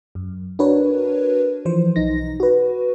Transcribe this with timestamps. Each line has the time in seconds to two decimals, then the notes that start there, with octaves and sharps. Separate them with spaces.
0.15 F#2
0.59 D4 F#4 A#4 B4 C#5
1.65 E3 F3 C5
1.96 B1 D#4 A#6
2.40 F#4 B4